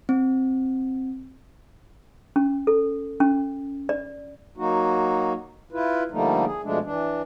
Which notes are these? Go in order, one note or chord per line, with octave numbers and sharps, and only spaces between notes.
C4
C#4
A4
C#4
D5
F#3 A#3 D#4 F#4
E4 F4 B4
D3 F3 G3 A3 A#3 D#4
G#4
B2 F3 G#3 A3 D4
E3 D4